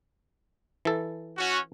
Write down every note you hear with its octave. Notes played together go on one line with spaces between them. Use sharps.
E3 A4
C#4 F#4